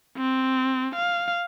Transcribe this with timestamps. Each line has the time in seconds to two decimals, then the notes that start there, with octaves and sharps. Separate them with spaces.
0.17 C4
0.95 F5